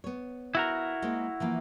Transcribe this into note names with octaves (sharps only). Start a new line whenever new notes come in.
B3 C#5
E4 F#4 A#4
G#3 A#3 C5
E3 F3 A#3